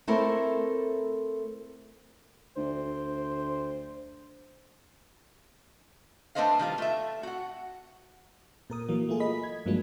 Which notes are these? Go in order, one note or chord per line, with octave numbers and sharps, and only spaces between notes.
A3 C4 E4 A4 A#4 C5
D2 C5
A3 D4 B4 C5 D#5 F5
D#3 G3 F4
A3 E5
F#4 F#5
A#2 A#4 D#6
E3 F#3 A#3
A3 A#3 F4 G#4
D#5 B5 B6
G#6
G2 F3 F#3 G#3 A#3 D4